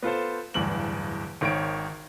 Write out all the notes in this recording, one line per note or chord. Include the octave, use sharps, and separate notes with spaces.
B3 F4 A4 C5
D1 E2 G2 F#7
G#1 D#3 C#5 D7